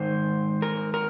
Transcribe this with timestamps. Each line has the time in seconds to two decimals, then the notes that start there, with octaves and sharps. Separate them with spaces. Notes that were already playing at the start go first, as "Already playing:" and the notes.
Already playing: G#2 D#3 C5
0.62 A#4
0.94 A#4